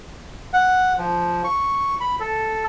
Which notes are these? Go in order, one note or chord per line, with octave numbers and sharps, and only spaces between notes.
F#5
F3
C#6
B5
A4